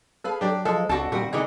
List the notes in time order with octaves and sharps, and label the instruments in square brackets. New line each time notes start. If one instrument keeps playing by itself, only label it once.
[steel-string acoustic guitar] G#4 B4 F5 [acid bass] A4
[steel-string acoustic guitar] F#3 [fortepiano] D4 G4
[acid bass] F3 [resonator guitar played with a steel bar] G#3 [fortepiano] A4
[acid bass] C#2 [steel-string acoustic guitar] C4 D4 [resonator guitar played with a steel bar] F#4 A4 [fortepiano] A5
[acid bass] A#2 [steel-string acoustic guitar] D#3 C4 F#5 [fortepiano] G3 [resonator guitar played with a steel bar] F#4
[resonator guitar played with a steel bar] D3 E3 D#4 [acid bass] G#4